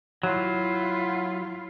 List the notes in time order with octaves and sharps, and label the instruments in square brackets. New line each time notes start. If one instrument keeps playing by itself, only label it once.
[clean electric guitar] F#3 [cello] E4 F4